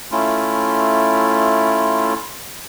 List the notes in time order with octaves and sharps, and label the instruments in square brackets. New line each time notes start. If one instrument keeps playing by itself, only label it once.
[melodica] A3 C#4 E4 F4